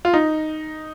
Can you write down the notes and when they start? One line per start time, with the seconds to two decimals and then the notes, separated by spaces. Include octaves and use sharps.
0.05 F4
0.14 D#4